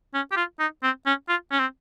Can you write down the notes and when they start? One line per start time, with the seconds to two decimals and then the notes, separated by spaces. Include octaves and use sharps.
0.14 C#4
0.32 G4
0.37 F4
0.59 D#4
0.83 C4
1.06 C#4
1.28 F4
1.51 C#4
1.59 C4